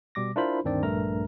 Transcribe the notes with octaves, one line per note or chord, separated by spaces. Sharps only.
B2 G3 D6 A#6
D4 E4 F4 A#4 C5 B5
D2 G2 D#3 C4 D4 D5
A#1 G2 A3 A#4 A#5